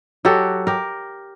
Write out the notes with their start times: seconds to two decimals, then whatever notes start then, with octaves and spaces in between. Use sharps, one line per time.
0.25 F#3 F#4 G4 A4
0.67 G4 A#4